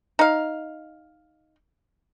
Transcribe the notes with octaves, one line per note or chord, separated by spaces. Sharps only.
D#4 F5